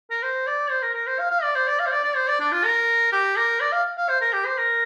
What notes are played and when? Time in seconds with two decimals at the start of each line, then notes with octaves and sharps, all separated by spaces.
0.11 A#4
0.23 C5
0.47 D5
0.71 C5
0.82 A#4
0.94 A#4
1.07 C5
1.19 F5
1.31 F5
1.43 D5
1.55 C5
1.67 D5
1.79 F5
1.86 C5
1.92 D5
2.04 D5
2.16 C5
2.28 D5
2.40 D4
2.52 F4
2.64 A#4
3.12 G4
3.37 A#4
3.60 D5
3.72 F5
3.97 F5
4.09 C5
4.21 A#4
4.33 G4
4.45 C5
4.57 A#4